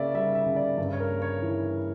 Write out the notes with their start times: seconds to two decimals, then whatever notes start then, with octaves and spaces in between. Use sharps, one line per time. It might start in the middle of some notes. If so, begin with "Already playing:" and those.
Already playing: C#3 A#3 D5 E5
0.14 G3 E5
0.35 E5
0.46 C#3
0.56 D5
0.78 G2
0.93 C#5
1.00 A#4
1.11 A#3
1.22 C#5
1.42 E3